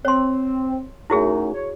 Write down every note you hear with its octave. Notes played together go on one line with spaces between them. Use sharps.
C4 C#5 C6
F#2 A3 D#4 E4 F#4 G#4
C#5